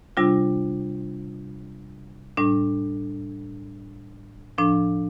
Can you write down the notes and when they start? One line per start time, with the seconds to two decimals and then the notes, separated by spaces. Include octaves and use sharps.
0.17 C3 G3 D4 F4
2.37 A2 G3 D4
4.58 A2 F3 D4